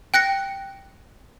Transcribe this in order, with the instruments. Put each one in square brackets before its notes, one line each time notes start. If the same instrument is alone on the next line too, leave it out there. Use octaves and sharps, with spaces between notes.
[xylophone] G5 F#6 A#6 C#7